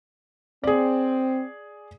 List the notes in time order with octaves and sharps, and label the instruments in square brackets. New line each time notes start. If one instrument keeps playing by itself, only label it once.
[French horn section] C4 [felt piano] G#4 D5